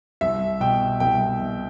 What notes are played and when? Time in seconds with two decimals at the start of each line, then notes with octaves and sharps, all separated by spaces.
0.21 C2 E5
0.60 B2 G5
1.00 C2 G5
1.40 B2